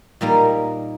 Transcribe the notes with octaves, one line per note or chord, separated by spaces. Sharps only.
A#2 G3 A#3 D#4